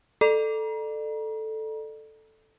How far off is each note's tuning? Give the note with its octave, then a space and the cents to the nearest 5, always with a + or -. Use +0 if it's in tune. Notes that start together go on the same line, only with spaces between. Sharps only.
A4 +0 D5 +35 A#5 +35